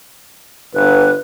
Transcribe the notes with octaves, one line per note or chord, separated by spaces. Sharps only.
G1 B4